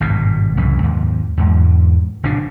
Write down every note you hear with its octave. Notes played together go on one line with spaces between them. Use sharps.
G#1 G2 B2
C2 F#2 C#3 E3
D#2 G#2
E2 G#2
F#1 A#2 C#3 D4